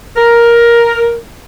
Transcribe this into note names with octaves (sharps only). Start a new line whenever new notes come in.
A#4